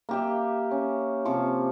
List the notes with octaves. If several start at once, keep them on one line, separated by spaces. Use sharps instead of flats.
A#3 G4 E5
C#4
C3 F3 C#6 D6